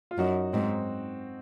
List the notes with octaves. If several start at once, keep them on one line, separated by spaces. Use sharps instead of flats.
F4
F#2 D#4 F#4
G#2 C4 D#4